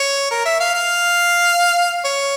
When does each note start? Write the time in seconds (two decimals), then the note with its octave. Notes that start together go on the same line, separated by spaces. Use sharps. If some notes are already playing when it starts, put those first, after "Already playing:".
Already playing: C#5
0.31 A#4
0.45 E5
0.60 F5
0.75 F5
2.05 C#5